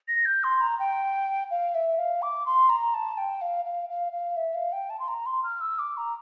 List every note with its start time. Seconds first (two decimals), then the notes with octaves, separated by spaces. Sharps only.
0.08 A#6
0.26 G6
0.44 C6
0.61 A#5
0.79 G5
1.51 F5
1.75 E5
1.98 F5
2.22 D6
2.46 C6
2.69 A#5
2.94 A5
3.18 G5
3.41 F5
3.65 F5
3.89 F5
4.12 F5
4.37 E5
4.55 F5
4.72 G5
4.90 A5
5.00 C6
5.08 A#5
5.26 C6
5.44 F6
5.61 E6
5.79 D6
5.97 A#5